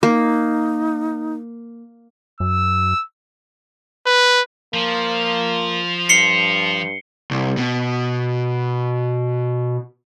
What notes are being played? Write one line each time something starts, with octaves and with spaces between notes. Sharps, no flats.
A#3 D#4
F#2 E6
B4
F3 A#3
G2 C7 C#7 G7
C2
B2